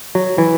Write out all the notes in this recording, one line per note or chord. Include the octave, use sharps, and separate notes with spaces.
F#3
E3